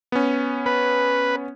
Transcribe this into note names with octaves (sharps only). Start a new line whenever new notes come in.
B3 C#4
B4